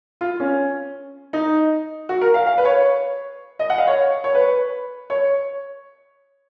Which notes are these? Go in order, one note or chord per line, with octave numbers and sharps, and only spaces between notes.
F4
C#4
D#4
F#4
A#4
F5
F5
B4
C#5
D#5
F#5
F5
C#5
C#5
B4
C#5